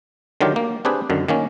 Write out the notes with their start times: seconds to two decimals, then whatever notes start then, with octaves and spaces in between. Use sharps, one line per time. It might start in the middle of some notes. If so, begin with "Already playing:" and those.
0.41 D3 D#3 F#3 F4 G4
0.56 A#3
0.85 C4 D4 G4 G#4 B4
1.10 F#2 D3 D#3
1.28 D#3 A#3 C#4